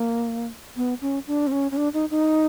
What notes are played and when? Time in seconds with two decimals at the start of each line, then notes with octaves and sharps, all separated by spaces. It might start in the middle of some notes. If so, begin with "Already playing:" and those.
Already playing: A#3
0.77 B3
1.01 C#4
1.27 D4
1.47 C4
1.52 C#4
1.71 C#4
1.77 D4
1.94 D#4
2.11 D#4